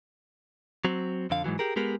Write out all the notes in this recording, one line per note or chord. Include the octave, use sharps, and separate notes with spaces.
F#3 C4
F2 D3 F5
G#2 B2 E3 F#3
G4 G#4 A#4
G#3 B3 G4 G#4 A#4